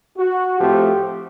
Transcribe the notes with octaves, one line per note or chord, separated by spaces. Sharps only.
F#4
A2 F3 A3 C4 G4